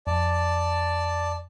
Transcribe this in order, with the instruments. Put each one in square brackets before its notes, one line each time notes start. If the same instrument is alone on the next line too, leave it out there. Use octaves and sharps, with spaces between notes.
[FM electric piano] F2 [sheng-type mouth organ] D5 A5